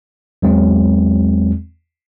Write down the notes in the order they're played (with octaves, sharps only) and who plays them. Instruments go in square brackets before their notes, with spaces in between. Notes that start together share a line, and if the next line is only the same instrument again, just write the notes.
[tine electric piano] E2 F#3 G#3 C4